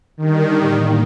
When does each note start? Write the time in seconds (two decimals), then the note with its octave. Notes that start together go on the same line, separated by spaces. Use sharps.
0.17 D3 D#3 G3 D4 G4
0.56 A2 G3 A#3